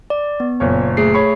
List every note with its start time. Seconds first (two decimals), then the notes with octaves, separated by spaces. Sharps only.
0.10 D5
0.40 B3
0.60 F#1 A#2 C#5
0.97 A3 G#4 C7
1.14 C#5 B5 C#6